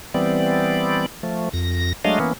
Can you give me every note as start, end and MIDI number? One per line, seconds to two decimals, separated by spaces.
0.14 1.06 52
0.14 1.06 55
0.14 1.06 59
0.14 1.06 60
0.14 1.06 74
1.23 1.49 53
1.23 1.49 57
1.53 1.93 41
1.53 1.93 94
2.05 2.19 54
2.05 2.19 56
2.05 2.19 57
2.05 2.19 62
2.05 2.19 75
2.05 2.19 77
2.20 2.33 52
2.20 2.33 58
2.20 2.33 59
2.20 2.33 61